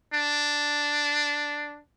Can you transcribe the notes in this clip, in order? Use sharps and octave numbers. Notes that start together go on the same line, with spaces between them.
D4